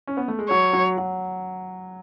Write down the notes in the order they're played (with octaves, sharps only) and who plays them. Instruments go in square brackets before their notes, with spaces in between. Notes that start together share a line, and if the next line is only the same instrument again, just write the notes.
[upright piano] C#4
B3
A3
G#3
[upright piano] F#3 [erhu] C#5
[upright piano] F#3
F#3